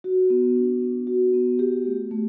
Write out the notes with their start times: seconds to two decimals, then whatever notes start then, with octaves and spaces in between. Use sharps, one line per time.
0.04 F#4
0.30 B3
0.56 D4
0.81 B3
1.07 F#4
1.34 B3
1.59 G4
1.85 A3
2.11 A3